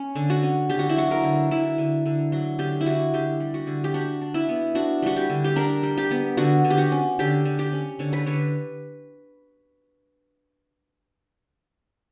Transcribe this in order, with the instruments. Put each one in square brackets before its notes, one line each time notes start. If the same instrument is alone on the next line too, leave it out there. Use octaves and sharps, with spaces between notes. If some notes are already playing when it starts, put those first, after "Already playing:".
Already playing: [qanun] C#4
D3
F#4
C#4
D3 G4
F#4
E4
F#3 F#4
A#4
D3
D3 E4
D3
D3
F#3 F#4
D3 G4
E4
D3 F#4
D3 G4
G3
F#4
D3
G4
D4 F#4
D4
E4
B3
D4 F#4
G3 F#4
G4
D3
G4
D4 A#4
G3
G4
B3
D3 F#4
D3
G4
F#4
C#4
D3 G4
D3
G4
C#4
D3 C#5
B4
D3 C#5